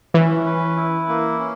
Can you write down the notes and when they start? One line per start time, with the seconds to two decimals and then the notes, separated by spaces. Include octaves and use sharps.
0.14 E3 C#4
0.46 B4
0.76 E4
1.08 A#3
1.39 C#4